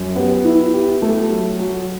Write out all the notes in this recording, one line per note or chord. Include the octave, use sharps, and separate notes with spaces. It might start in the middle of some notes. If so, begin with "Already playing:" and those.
Already playing: F#2
B3 G4
E4
G4
A3
F#3
F#3